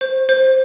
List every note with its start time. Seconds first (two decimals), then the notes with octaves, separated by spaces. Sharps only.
0.01 C5
0.29 C5